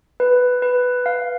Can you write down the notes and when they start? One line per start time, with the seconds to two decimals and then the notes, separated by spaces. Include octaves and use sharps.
0.20 B4
0.62 B4
1.06 F5